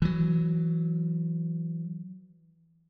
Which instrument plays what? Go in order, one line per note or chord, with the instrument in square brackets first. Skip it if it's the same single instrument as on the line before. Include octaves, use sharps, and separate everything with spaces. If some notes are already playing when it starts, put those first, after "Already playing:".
[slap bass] E3 F#3